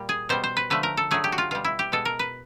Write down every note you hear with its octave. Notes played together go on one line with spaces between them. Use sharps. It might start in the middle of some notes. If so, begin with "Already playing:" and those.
Already playing: A#2 G3
G#4
B2 G3 C5
C5
B4
D3 F3 A3 B4
A#4
A4
D3 F#3 A3 G#4
G4
F#4
F4
B2 G3 F4
E4
G4
B2 G#3 A4
A#4
B4